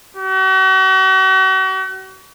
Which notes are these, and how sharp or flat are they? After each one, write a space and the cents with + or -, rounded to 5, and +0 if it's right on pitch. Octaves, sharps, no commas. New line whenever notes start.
F#4 +40